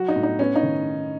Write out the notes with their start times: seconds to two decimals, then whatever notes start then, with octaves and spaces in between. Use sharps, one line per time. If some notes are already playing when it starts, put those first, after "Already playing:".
Already playing: F#3 F#4
0.08 D#4
0.16 A2
0.23 D#4
0.39 B3 C#4
0.56 D#4
0.63 D#3